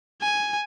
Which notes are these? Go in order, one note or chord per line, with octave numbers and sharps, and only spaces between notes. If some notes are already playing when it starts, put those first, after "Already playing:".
G#5